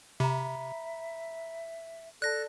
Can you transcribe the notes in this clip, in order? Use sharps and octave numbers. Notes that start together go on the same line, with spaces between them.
C3 E5 A#5 B5
A4 D5 A5 F#6 A#6